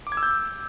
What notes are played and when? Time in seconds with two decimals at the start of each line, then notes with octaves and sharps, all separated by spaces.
0.07 D6
0.12 G#6
0.17 E6
0.23 G6